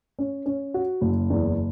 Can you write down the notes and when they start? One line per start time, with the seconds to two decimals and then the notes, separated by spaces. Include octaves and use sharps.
0.19 C#4
0.46 C#4
0.74 F#4
1.01 F#1
1.30 E2